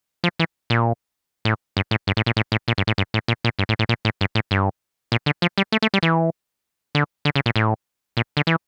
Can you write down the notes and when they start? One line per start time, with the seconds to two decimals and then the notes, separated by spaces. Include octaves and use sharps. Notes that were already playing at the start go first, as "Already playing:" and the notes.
0.24 F3
0.39 E3
0.70 A#2
1.45 A2
1.77 G2
1.91 A2
2.07 G2
2.17 A2
2.26 A#2
2.37 A2
2.52 A2
2.68 A#2
2.78 G2
2.87 A2
2.98 G2
3.14 A2
3.28 A#2
3.45 A#2
3.59 G2
3.69 A2
3.79 A2
3.89 A#2
4.05 A2
4.21 G2
4.35 A2
4.51 G2
5.12 A#2
5.26 D3
5.42 F3
5.58 G3
5.72 A3
5.82 A3
5.94 G3
6.03 E3
6.95 D3
7.25 D3
7.36 C#3
7.46 A#2
7.56 A2
8.17 A#2
8.37 D3
8.47 E3